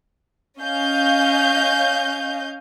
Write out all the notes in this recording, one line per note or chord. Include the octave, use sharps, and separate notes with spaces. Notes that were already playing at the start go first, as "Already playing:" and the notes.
C#4 D#5 F5 G6